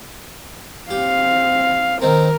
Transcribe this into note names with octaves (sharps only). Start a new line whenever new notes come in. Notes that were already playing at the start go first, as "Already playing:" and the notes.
C4 G4 F5
D#3 C4 A#4